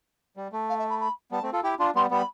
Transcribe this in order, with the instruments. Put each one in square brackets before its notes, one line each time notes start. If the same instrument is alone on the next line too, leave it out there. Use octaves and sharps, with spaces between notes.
[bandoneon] G3
A3
[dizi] F5
E5
B5
B5
[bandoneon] G3 B3 [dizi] A5
[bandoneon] A3 C4
F4 A4
[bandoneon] E4 G4 [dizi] G5
[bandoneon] D4 F4 [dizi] C6
[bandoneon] G3 B3 [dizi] C6
[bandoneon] G3 B3 [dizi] B5